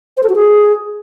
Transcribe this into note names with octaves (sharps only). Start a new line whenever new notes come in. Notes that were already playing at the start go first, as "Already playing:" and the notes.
C5
A4
F#4
G#4